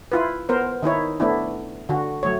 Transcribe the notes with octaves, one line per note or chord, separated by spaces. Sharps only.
E4 F4 B4
B3 A#4 C5
D#3 D#4 E4 C#5
A3 B3 D4 E4
D3 F#4
F#3 A3 C#5